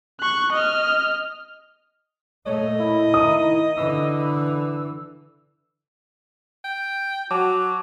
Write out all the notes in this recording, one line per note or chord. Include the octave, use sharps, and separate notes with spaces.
C#6 F#6
D#5 F6
A#2 A3 C#5 D#5
E4
D#3 D#6
D3 E3 E6
G5
F#3 F#4 A5 D6